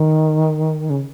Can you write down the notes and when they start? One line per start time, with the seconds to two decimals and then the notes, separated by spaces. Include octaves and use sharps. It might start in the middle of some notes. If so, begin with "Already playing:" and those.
Already playing: D#3
0.90 C#3